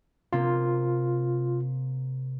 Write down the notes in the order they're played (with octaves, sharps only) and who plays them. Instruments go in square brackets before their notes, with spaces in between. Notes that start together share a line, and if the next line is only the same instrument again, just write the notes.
[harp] C3 A#3 C4 [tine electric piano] F4